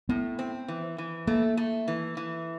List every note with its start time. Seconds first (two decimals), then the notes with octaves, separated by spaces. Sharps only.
0.09 A2 B3
0.39 C4
0.68 E3
0.98 E3
1.27 A3 A#3
1.57 A3
1.88 E3
2.17 E3